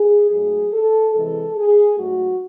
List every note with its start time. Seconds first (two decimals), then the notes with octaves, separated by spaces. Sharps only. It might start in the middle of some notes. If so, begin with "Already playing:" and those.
Already playing: G#4
0.31 G#2 F#3 A3 G#4
0.73 A4
1.14 C3 E3 G#3 A4
1.57 G#4
1.99 G#2 F#3 A3 F#4